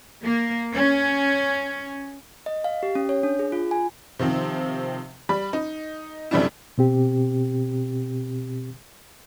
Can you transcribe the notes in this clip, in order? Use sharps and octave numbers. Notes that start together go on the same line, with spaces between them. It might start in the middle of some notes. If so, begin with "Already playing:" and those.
A#3
C#4
D#5
F5
G4
C#4
C#5
D4
G#4
F4
G#5
C3 D#3 F3 C4
G3 B5
D#4
F#2 C3 G3 A3 D4 E4
B2 C4 G4